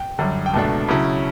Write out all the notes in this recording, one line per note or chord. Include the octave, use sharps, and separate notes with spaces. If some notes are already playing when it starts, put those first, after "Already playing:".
Already playing: G5
F#2 D3 G3
G5
C#2 B2 A3 D4 A5
C#3 F#3 C#4 E4